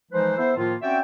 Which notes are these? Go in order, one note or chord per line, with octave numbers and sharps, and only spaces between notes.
E3 F3 G#3 D#4 B4 C5
B3 E4 A4 C5
A2 D#3 F3 A#3 F4
C4 C#4 F#4 D5 E5 G5